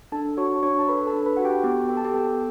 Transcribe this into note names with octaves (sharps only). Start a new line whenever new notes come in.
D4 A4 A5
F#4 C#5 C#6
D4 C#5 C#6
A5
A4 B4 B5
A4 A5
D4
B4 B5
F#4 F#5
G4 G5
B3 G4 G5
A4 G5
A5
G4 G5
B3 A4 A5